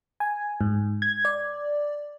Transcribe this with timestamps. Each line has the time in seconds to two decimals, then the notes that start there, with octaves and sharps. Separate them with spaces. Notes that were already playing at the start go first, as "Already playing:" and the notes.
0.20 G#5
0.61 G#2
1.02 G#6
1.25 D5